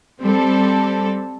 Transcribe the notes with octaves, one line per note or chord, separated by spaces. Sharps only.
G3 C4 A4